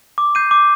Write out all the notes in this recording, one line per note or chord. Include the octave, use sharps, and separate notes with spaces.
D6
G6 C7 D#7
D6